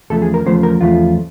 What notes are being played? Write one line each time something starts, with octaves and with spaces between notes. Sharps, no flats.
E2 C#3 F3 A3 A4
G#4
A#4
E2 C#3 F3 A3 C5
A#4
E2 C#3 F3 A3 F4